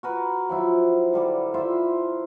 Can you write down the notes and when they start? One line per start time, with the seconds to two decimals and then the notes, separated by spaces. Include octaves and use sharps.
0.03 F#4 A#4 B4
0.49 F3 F#3 E4
1.13 D3 G3 D6
1.54 E4 F4 C5 E5